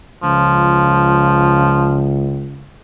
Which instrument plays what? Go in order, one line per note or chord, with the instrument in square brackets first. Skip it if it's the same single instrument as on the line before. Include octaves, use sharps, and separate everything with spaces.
[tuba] C#2 [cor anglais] F3